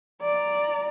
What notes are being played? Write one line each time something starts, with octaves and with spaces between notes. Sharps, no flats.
D5 A#5